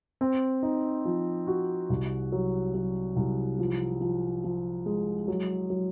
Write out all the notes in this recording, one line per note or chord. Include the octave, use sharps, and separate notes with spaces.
C4
D#4
F3
F#4
C2
F#3
F#3
C2
F3
F3
F3
G#3
F#3
F#3